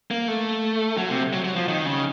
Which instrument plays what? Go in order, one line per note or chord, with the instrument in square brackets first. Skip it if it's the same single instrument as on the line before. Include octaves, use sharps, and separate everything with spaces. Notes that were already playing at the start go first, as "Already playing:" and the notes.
[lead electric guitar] A#3
A3
F#3
C3
F#3
F#3
F3
D#3
C#3